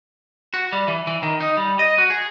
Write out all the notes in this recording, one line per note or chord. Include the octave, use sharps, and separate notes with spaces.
F#4
G3
E3
E3
D#3
D#4
G3
D#5
F#4
G#4